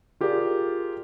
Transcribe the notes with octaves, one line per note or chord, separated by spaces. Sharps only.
F4 G4 G#4 A#4 D5